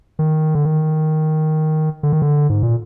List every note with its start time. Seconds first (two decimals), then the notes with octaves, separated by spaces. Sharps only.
0.19 D#3
0.55 D3
0.65 D#3
2.03 D3
2.13 D#3
2.22 D3
2.50 G#2
2.63 A#2